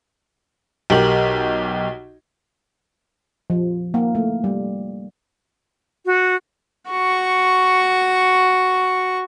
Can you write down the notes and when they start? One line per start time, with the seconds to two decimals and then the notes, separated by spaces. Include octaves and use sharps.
0.90 B1 G4 A#4 F#7
3.50 F3
3.94 A#3
4.15 A3
4.44 G3
6.06 F#4
6.90 F#4 C#6